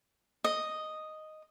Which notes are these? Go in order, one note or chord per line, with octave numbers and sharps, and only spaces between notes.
D#5